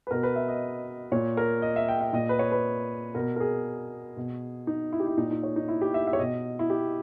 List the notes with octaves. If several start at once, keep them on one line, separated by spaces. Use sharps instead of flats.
B4
B2 A#4
B4
E5
D#5
A#2 C#5
A#4
D#5
E5
G5
E5
A#2 D#5
B4
C#5
B4
B2 A#4
A#4
G#4
B2
D#4
E4
G4
E4
A#2 D#4
D#4
C#5
D#4
E4
G4
E5
E5
C#5
B2 D#5
E4
G4